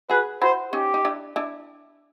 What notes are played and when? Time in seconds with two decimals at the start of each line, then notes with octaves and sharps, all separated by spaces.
0.10 F#4 G#4 B4
0.42 E4 F#4 C5
0.73 C#4 D#4 G4
0.94 D#4
1.05 D4 E4
1.36 D4 E4